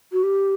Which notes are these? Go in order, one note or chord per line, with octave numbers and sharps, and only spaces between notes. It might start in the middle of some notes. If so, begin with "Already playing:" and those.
F#4
G4